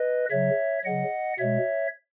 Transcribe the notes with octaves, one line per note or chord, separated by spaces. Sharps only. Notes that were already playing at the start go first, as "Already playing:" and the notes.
Already playing: B4 D#5
C#3 F#3 C#5 E5
C#3 F#3 D#5 F#5
B2 G#3 C#5 E5